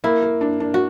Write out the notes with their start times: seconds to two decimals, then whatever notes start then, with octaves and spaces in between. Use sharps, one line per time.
0.04 A#3 E4
0.22 A#3
0.41 D4
0.60 D4
0.74 F#4